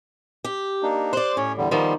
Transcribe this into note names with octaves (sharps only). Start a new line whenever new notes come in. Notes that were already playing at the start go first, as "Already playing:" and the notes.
G4
A#3 D4 D#4
C5 D5 C6 F#6
A2 C#4 C#5
E2 D3 G3
D#3 F3 G3 B3 C6